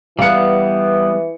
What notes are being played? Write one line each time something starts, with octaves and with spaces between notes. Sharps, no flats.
E3 G3 B3 F5 C#7